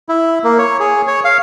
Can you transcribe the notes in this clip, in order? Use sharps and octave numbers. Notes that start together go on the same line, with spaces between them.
E4
A#3
C#5
G#4
C#5
F5